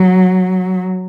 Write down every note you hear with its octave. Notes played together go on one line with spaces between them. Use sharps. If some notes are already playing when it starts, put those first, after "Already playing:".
Already playing: F#3